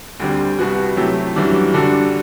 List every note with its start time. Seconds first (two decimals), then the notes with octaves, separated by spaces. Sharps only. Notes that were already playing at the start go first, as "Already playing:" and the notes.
0.20 D2 D3 G3 C4
0.59 C2 B2 G3 B3 F#4
0.97 C3 F#3 A3 E4 G4
1.36 F#2 E3 G3 D4 F#4
1.74 D3 G3 D4 F#4 A4